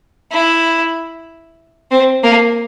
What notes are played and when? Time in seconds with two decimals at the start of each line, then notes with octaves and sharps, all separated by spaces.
0.32 E4
1.92 C4
2.24 A#3